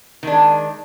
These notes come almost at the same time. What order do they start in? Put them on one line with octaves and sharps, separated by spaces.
D#3 D4 G#3